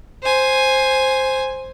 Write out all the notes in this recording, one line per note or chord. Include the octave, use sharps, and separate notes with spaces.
C5 G#5